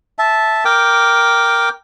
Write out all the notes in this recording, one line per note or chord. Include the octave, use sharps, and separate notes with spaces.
E5 A5
A#4 G5 D6